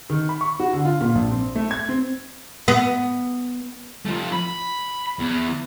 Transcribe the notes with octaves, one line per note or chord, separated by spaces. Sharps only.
D#3
B5
C#6
F#4
D3
F4
A#2
A#1
C4
A3
G#6
C4
B3
F3 A3
B5
E2